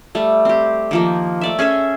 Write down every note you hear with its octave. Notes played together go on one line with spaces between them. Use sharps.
G3 A3
C4 G4
D#3 F3 A#3
A3 D5 E5
C#4 G#4 A4 E5